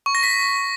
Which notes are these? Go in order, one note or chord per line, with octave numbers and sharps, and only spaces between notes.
C#6
A#6
B6